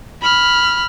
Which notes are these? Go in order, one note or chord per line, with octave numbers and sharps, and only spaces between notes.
B5 F6